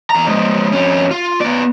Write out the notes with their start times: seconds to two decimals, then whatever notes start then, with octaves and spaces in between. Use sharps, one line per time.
0.10 E2 A#5
0.28 F3 G#3
0.71 F2 C#4
1.11 F4
1.40 B3 D5